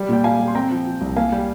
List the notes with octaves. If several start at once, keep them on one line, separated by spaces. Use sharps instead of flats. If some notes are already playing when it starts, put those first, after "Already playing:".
Already playing: G3
A#2 G5
A#2 F5 G#5
G3
C6
C4 G5 A#5
F3
F3
C2
A#3 F5 G#5
G3 G5